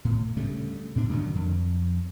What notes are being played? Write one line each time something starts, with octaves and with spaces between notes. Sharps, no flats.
A2
D2 C#3 G3 A3
A2 C3 D4
F#2 D3 D#3 F#3
F2